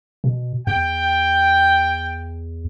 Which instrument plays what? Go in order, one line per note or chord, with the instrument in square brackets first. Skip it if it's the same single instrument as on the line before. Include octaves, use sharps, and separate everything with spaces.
[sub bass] B2
[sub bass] E2 [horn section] G5